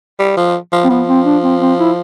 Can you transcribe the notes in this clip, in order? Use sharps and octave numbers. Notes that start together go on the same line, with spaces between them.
G3
F3
F3
C4
F3 B3
C4
D4
C4
C4
E4